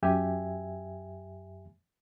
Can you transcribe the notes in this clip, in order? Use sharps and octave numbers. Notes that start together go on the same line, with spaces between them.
F#2 G4 E5 G#5